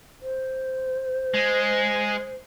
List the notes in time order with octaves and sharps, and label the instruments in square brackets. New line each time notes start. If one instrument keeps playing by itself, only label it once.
[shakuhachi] C5
[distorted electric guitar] G#3